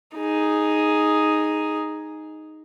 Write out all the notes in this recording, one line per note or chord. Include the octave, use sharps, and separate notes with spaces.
D#4 G#4